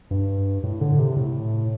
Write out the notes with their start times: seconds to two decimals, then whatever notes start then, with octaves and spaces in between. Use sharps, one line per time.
0.11 G2
0.63 A2
0.81 D3
0.99 C3
1.17 A2